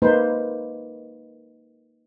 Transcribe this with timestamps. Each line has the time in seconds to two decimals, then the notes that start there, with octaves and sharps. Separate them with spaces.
0.02 A#3 D#4 B4 C5